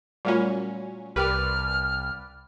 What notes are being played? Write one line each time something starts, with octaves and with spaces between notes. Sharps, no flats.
A#2 F#3 G3 A3 C#4 F4
C2 G4 A#4 B4 D5 G5 F6